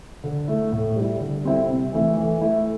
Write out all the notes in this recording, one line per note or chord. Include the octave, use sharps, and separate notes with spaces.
D3
A3 E4
A2
G3 E4
D3
G3 C4 E4
C3
E3 A3 E4
E3
A3 E4